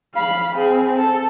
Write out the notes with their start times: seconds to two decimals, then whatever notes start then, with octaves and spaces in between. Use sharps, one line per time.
0.14 F5 B5
0.55 C4 G#4
0.97 A4